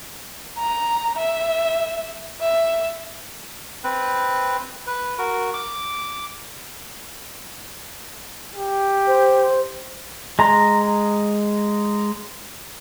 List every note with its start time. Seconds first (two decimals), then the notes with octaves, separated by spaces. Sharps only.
0.58 A#5
1.18 E5
2.41 E5
3.84 C4 B4
4.87 B4
5.18 F#4 A#4
5.54 D6
8.55 G4
9.07 C5
10.39 G#3 A#5